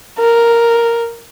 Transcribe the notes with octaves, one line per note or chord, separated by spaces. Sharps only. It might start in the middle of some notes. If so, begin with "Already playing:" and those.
A#4